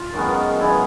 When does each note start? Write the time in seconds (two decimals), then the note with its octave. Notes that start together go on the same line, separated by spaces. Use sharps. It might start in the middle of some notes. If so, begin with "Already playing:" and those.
Already playing: F4
0.14 F#2 D#3 G#3 B3
0.59 F#2 D#3 G#3 B3 E4